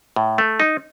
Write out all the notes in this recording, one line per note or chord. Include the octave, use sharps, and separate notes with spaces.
A2
A3
D#4